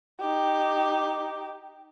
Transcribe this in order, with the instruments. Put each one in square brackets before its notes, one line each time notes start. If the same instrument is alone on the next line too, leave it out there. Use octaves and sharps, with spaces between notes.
[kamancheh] D#4 G4